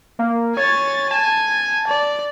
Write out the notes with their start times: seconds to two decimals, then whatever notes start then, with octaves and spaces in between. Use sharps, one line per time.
0.19 A#3
0.57 C#5 G#5 A6
1.11 G#5 A5
1.88 D5